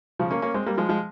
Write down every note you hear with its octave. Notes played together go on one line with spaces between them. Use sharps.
C#3 F3
A#3 C#4
A#3 C#4
G#3 C4
G3 A#3
F3 G#3
F3 G#3